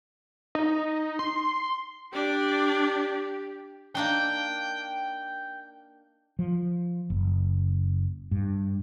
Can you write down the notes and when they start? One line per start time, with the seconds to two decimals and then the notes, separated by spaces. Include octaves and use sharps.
0.55 D#4
1.19 C6
2.13 D4 G4 D5
3.95 A#3 D4 D#4 G5
6.39 F3
7.10 F#1
8.31 G2